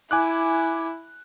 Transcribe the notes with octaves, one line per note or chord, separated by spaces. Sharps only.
E4 G#5 D6 F#6